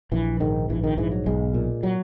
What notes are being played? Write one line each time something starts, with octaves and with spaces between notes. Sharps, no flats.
A#1 E3
G#2 D#3
A#1 E3
D#3
G#2 E3
F#3
B1 G#3
A#2
F#3